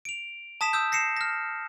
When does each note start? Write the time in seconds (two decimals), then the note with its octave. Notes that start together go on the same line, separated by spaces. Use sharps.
0.05 D7 F7
0.61 A5 D#6 B6 E7
0.73 D#6 E6 G6
0.92 A#6 C7 C#7 E7
1.17 F6 A#6